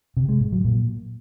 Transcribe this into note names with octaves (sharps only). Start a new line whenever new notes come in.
C3
G#3
A2
F#3
A#2